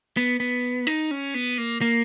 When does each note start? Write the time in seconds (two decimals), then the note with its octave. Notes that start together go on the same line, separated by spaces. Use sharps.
0.17 B3
0.40 B3
0.87 D#4
1.11 C#4
1.34 B3
1.58 A#3
1.81 A#3